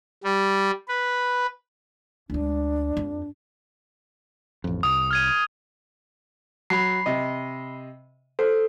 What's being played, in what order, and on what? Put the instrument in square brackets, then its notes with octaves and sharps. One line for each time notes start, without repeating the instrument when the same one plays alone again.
[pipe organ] G3
B4
[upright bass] D2 G#3 [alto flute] D4
[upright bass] F2
[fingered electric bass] A1 F2
[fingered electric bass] C2 [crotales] D#6
[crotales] F6 G#6 D#7
[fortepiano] F#3 [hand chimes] B5 C7
[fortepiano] C3 D#5
[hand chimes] A4 [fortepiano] C5